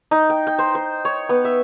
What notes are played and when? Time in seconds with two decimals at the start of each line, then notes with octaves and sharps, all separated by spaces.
0.11 D#4
0.30 G5
0.47 G5
0.59 C5
0.75 C5
1.05 C#5
1.29 B3
1.45 E5